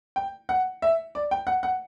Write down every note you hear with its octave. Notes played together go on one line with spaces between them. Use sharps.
G5
F#5
E5
D5
G5
F#5
F#5